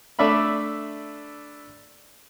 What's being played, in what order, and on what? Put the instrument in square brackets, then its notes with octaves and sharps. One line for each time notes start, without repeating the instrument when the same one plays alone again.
[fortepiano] A3 D4 D5 E5 B5